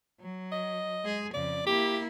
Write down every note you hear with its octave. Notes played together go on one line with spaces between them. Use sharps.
F#3
D#5
G#3 G#4
F2 C#3 D5
A#3 E4 G4